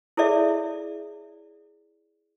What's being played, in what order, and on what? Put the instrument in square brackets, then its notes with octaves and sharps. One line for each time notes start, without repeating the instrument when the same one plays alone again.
[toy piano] E4 G#4 A4 C#5 D5 E5